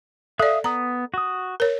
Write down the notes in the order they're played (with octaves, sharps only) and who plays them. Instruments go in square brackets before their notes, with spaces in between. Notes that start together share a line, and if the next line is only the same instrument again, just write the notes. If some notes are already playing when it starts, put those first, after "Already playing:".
[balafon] A4 D5 [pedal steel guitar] E5 F5 D#6
[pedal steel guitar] B3 D#6 [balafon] A#5
[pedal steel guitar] F#4 D#6
[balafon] A#4 C#5